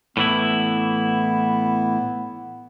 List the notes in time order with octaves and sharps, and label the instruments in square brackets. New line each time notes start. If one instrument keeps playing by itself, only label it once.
[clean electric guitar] A2 E3 E4 [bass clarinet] B3